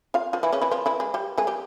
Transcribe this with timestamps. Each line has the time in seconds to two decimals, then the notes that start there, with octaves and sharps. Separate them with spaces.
0.14 F4 F5
0.33 F3 F4
0.43 E3 E4
0.52 C#3 C#4
0.62 E3 E4
0.71 F3 F4
0.86 E3 E4
1.00 G#3
1.14 G3 G4
1.38 G#3 G#4
1.47 G3 G4